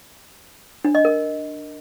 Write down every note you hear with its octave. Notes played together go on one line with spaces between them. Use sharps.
D4
D#5
A#4